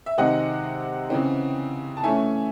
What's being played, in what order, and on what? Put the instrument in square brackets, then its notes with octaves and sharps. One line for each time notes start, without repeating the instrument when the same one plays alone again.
[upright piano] E5
C3 D#3 G#3 C4 D#5 F#5
C#3 E3 C4
A5
E3 A3 C#4 E5 G#5